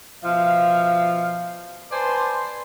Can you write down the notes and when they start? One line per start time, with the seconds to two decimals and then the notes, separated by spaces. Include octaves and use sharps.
0.23 B2 F3 E5 F5
1.92 B4 C5 D5 G#5 A5 C6